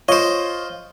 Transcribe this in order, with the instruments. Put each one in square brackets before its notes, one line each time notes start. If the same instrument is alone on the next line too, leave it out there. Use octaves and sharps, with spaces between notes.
[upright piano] F4 [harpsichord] C5 D#5 [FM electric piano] C#5